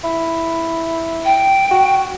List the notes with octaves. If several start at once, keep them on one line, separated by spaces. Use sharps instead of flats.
E4
G5
F#4